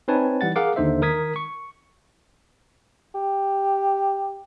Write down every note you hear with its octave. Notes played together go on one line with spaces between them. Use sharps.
C4 D#4 B4 C#5 G#5 A5
E3 G3 F#5 A6
G#4 A#4 F5 F#5 D6
D#2 D3 D#4 C5 E5
D#3 A#4 D#6 G#6 B6
C#6
G4